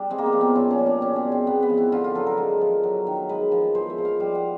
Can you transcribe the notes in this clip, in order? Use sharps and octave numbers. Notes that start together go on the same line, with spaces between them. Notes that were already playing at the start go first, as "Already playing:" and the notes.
Already playing: G3 D4
G#3 C4
A#3
B3
F3
C4
A#2 C#4
C#4
G3
D4
B2 C#4
C4
G#3
C4
G#3 B3
B3
F3
E4
D3 F4
F4
F#3 A4
A#4
G#3
F3
F#3
D#3
G#3 B4
F3
G#3 C5
E5
F3
F5
G3 F5
F#5